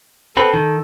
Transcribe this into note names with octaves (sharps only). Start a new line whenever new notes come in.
B3 C4 A4 B4
D#3